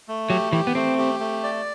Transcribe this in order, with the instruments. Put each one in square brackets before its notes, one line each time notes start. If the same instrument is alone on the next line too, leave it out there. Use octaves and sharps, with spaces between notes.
[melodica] A3
[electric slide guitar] F#3 [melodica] G4
[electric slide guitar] E3 [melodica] G4
[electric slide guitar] B3
[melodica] A3 [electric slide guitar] C4
[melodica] G4
A3
D5